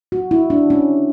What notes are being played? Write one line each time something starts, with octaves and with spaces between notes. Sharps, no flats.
F#4
E4
D4
C#4